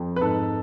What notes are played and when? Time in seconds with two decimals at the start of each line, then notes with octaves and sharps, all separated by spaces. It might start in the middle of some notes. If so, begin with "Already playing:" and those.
Already playing: F2 F3
0.16 B4
0.21 G#2 A4